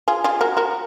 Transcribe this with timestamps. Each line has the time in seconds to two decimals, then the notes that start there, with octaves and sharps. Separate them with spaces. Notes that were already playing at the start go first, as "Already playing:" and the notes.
0.08 F4 G#4
0.24 F4 G#4
0.41 F#4 A#4
0.57 F#4 A#4